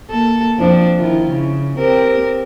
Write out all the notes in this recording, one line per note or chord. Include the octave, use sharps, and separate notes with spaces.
A#3 A4
F2 F3 D4
D#3 E4 F4
C#3
C4 G4 A#4